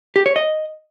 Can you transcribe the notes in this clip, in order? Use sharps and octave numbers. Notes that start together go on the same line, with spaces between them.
G4
C#5
D#5